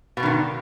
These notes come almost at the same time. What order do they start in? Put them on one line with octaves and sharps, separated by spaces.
B2 G2 D#3 D3